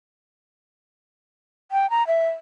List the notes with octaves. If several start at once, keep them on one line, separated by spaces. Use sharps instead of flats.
G5
A#5
E5